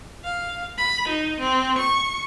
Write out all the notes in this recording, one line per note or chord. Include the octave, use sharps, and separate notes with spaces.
F5
B5
D#4
C4
C#6